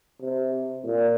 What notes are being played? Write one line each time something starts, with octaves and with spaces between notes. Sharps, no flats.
C3
A#2